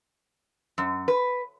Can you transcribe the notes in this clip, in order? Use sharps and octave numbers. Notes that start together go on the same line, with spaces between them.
F#2
B4